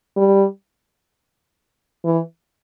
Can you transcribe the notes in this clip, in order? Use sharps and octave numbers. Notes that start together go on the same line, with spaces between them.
G3
E3